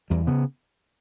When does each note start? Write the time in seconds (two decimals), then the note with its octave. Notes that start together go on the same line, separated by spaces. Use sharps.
0.10 E2 G3
0.27 C#3 B3